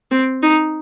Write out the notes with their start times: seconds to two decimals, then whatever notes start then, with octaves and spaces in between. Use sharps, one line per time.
0.11 C4
0.43 D#4